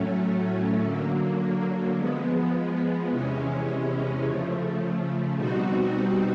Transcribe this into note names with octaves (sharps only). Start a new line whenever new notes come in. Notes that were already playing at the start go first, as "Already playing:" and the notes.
Already playing: A2 F#3 A3 C#4
D3 F#3 A#3
F3 G#3 B3
E2 C3 E3 G#3 C#4
C#3 F3 A3
B2 G3 C4 D#4 F#4